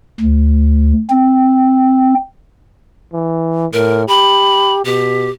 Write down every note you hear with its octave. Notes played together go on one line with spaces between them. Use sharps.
D2
C4
E3
A2 A#4
G4 B5
B2 G4